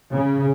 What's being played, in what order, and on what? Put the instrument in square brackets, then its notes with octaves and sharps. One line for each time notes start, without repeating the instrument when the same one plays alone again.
[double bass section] C#3